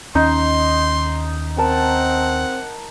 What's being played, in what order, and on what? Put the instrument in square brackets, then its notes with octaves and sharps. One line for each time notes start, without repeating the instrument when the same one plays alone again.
[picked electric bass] D#2 C#4 [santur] D#4 [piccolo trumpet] C6
[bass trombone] C4 [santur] A#4 A5 [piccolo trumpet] F#5